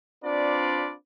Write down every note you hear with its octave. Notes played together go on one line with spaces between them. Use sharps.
C4 D4 F4 B4 D5